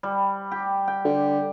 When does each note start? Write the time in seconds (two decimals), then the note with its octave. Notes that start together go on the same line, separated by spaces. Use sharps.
0.03 G3
0.51 G4
0.88 G5
1.04 D3